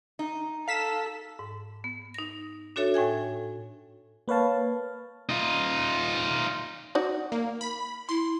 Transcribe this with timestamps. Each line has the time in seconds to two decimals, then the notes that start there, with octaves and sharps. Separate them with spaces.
0.19 D#4
0.68 A4 F5 B6 E7
1.39 G#2
1.84 B3
2.14 D#4 A#6
2.76 D4 F#4 A4 C#5 E5
2.94 A2 G5 G#5 G#6
4.28 A#3 B4 C#5 F5 A5
5.29 D#4 F4
6.95 D#4 F#4 D5
7.32 A#3
7.61 B5
8.09 E4 C6